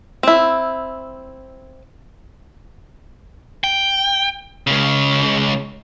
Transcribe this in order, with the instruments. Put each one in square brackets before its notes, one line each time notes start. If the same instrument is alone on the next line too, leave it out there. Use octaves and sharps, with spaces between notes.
[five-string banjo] C4 E4
[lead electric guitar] G5
C#2 C#3